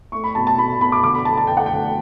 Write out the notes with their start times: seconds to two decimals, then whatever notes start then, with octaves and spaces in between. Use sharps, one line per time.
0.12 A3 C#6
0.24 B5
0.35 B2 A5
0.47 A5
0.58 B2 B5
0.81 B2 B5
0.92 D6
1.03 D3 D6
1.14 B5
1.25 A3 A5
1.38 A5
1.47 A3 G5
1.57 F#5
1.66 G5
1.71 D3